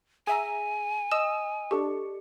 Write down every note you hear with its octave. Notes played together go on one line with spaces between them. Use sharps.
G#4 E5 G#5 A#5
D#5 D#6 E6 E7
D4 G4 A4 C#6